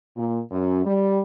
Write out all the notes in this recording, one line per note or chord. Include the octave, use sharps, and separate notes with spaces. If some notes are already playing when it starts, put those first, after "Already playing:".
A#2
F#2
G3